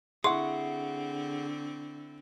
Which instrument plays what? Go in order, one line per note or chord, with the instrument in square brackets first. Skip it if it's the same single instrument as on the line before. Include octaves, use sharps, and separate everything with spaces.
[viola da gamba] D3 C4 [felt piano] E4 C#6 [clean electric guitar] G#4 F#5 [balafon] C6